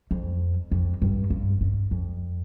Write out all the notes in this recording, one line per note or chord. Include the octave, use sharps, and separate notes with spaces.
F2
F2
G2
G2
G2
F2